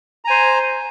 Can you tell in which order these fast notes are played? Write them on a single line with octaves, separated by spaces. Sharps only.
A#5 G#5 C5